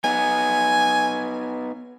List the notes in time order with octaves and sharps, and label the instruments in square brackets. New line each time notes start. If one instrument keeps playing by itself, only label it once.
[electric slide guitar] B3 D#4 [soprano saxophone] G#5